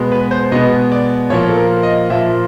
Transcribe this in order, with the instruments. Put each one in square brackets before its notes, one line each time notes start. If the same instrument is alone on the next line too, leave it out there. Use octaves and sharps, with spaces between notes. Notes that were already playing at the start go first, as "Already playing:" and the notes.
Already playing: [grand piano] B2 G#3 B3
B4
C5
B2 G#3 B3 D#5
D5
A#2 F3 A#3 C#5
A4
A#4
D#5
A#2 F3 A#3 E5